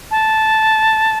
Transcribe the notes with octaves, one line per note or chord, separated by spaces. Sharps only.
A5